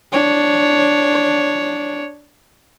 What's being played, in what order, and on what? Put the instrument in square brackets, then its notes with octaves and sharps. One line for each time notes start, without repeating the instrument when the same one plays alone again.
[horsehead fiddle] D4 C#5